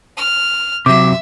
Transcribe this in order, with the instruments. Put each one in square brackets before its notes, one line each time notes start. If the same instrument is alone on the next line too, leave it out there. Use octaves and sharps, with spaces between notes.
[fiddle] F6
[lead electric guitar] C3 F#3 [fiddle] E5 [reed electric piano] D6